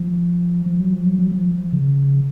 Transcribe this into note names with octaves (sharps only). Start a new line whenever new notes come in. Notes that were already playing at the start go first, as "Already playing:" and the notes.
Already playing: F3
F3
F#3
F3
F#3
F#3
F#3
F3
C#3